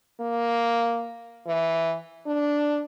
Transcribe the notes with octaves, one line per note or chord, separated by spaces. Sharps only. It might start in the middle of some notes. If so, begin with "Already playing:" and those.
A#3
E3
D4